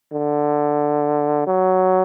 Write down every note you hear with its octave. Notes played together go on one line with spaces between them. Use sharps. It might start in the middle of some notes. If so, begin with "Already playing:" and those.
D3
F#3